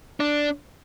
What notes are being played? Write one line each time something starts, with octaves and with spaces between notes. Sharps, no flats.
D4